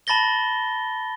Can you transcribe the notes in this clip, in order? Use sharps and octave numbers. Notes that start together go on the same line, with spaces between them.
A5 B5 A6 A#6 G7